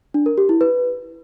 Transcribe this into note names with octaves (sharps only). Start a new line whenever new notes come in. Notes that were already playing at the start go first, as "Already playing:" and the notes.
D4
A#4
G4
E4
B4